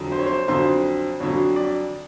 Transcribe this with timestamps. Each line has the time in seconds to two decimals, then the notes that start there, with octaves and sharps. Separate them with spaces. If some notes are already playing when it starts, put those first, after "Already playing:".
Already playing: F2 D3 F#3
0.12 C5
0.19 C#5
0.26 C5
0.48 F2 D3 F#3 C5
1.20 F2 D3 F#3 C#5
1.56 D5